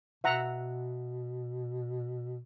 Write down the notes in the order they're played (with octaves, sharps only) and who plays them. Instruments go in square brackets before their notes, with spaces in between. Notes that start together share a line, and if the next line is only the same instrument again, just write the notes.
[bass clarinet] B2 [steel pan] E5 F#5 A#5